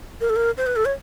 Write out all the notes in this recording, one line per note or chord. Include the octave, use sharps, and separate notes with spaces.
A#4
A4
A#4
C5
B4
A4
C#5